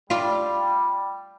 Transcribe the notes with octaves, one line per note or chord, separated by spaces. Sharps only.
G3 F4 D5